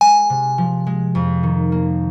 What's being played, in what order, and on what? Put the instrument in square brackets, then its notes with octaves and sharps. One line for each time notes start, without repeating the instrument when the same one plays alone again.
[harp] G#3 [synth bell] G#5
[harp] C3
F3
G#3
F2
D#3
A#3